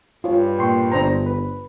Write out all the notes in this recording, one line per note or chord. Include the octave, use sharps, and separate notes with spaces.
G2 F4 C#5
A#2 G5 C6 C#6
G1 D4 C5 A#5
B4